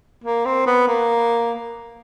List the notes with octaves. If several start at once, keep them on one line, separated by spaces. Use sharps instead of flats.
A#3
C4
B3
A#3